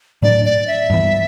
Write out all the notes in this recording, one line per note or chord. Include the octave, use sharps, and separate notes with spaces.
A2 F#3 A3 D4 D5
D5
E5
G2 E3 B3